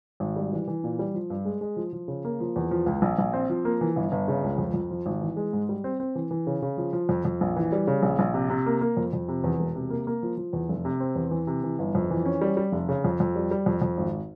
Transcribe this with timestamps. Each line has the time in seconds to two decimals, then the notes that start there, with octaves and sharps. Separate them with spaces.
0.20 G#1
0.36 G3
0.53 E3
0.67 E3
0.84 A#2
0.99 G3
1.14 F3
1.30 G2
1.45 G#3
1.61 G#3
1.77 F3
1.93 F3
2.08 C#3
2.25 A#3
2.40 F3
2.56 E2
2.71 F3
2.86 C#2
3.02 A#1
3.18 A#1
3.33 C4
3.50 F3
3.65 A#3
3.81 E3
3.96 G1
4.12 G1
4.28 C#3
4.43 C#2
4.58 F2
4.74 F2
4.91 F3
5.06 G#1
5.21 E3
5.36 G#3
5.53 G#2
5.69 G3
5.84 C4
6.00 C4
6.15 E3
6.31 E3
6.47 C#3
6.62 C#3
6.77 F3
6.93 F3
7.09 F2
7.25 F2
7.41 A#1
7.56 E3
7.72 G3
7.87 C#3
8.03 A#1
8.19 A#1
8.34 C3
8.50 C3
8.66 A#3
8.81 A#3
8.97 F2
9.13 F2
9.28 C3
9.44 E2
9.60 E1
9.75 C3
9.90 A#3
10.07 A#3
10.23 F3
10.37 F3
10.53 E2
10.69 F1
10.85 C3
11.00 C4
11.16 E2
11.31 E3
11.47 C3
11.64 E3
11.79 G1
11.95 F2
12.11 E3
12.25 C#4
12.41 G3
12.57 G3
12.72 F1
12.89 C#3
13.04 F2
13.20 F2
13.36 G3
13.51 G3
13.66 F2
13.82 F2
13.98 G#1